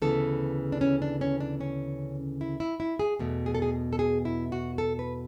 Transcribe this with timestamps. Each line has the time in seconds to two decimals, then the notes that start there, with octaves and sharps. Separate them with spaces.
0.02 D2 C#3 E3 B3 A4
0.72 D4
0.81 C#4
1.02 D4
1.21 C#4
1.40 D4
1.61 C#4
2.41 E4
2.60 E4
2.80 E4
2.99 G#4
3.19 E2 B2 A3
3.46 G#4
3.55 A4
3.62 G#4
3.93 A4
3.99 G#4
4.25 E4
4.52 F#4
4.78 A4
4.99 B4